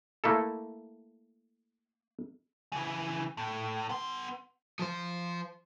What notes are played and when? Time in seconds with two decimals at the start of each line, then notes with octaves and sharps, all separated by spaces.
0.24 A3 A#3 E4 A4
2.72 C#3 E3
3.37 A2
3.89 B3 C6
4.79 F3 C5